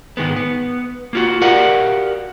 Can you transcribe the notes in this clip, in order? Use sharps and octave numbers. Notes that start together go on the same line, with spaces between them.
G#2 D#3 G#3 B3
B3
A#3 F4 F#4
F#4 G4 A#4 D5 F5 F#5